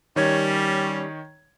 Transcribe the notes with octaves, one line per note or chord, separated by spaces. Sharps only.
D#3 G3 C#4 C#5 G#6